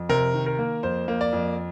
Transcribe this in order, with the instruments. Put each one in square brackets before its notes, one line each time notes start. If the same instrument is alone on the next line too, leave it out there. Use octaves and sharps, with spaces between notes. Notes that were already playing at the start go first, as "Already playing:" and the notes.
Already playing: [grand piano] F2
C3 A#4
D#3
A#4
A#3
F2 C5
A#3
D5
F2